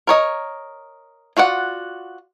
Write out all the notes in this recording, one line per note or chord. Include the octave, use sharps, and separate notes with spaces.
A#4 C#5 D#5
F4 F#4 D5 F#5